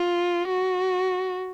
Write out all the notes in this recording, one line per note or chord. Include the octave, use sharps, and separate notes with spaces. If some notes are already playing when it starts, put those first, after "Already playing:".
Already playing: F4
F#4